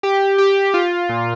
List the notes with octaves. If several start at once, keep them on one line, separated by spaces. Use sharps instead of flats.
G4
G4
F4
A#2